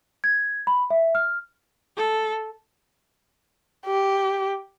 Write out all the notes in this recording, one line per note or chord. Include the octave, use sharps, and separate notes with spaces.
G#6
B5
E5
F6
A4
G4